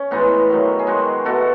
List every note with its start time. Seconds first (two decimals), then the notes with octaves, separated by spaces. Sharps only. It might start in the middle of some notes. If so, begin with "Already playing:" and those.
Already playing: C#4 C#5
0.11 A2 E3 G#3 B3 D#4
0.50 D#3 F#3 A3
0.79 G#4
0.87 D#3 G#3 D#4 F#4
1.25 B2 A3 F#4 A4